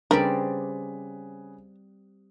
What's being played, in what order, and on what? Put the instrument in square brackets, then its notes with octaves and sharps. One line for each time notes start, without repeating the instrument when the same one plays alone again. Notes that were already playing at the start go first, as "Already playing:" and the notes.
[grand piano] C#3 G#4 B4 [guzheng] G3 C4 D5 [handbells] D4 [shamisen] A#4